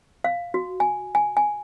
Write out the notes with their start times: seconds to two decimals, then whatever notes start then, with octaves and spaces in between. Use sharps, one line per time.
0.24 F5
0.54 F#4
0.80 G#5
1.15 G#5
1.37 G#5